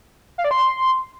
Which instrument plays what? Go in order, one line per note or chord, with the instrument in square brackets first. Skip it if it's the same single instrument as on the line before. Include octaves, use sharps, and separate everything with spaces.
[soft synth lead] F5
D5
C6